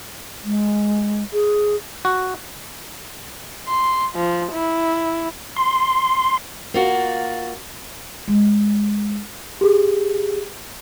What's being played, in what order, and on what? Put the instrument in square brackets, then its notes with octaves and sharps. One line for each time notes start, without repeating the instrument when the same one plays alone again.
[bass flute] G#3
G#4
[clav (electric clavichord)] F#4
[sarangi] C6
F3
E4
[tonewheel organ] C6
[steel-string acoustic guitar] A#3 F4 F#4
[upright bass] G#3
[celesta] G4 G#4